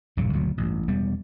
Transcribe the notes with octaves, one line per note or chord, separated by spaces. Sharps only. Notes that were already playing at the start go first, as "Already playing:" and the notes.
E1 A#1 G2 C#3
F#1 D2 B2 F#3
A1 G2
E1 G3 B3